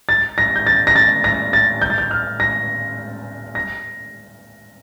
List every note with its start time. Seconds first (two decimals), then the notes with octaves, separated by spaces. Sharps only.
0.09 A6
0.38 A#6
0.56 G6
0.67 A6
0.87 A#6
0.96 A6
1.24 A#6
1.53 A6
1.82 G6
1.90 A6
1.98 G6
2.11 F6
2.40 A#6
3.55 A#6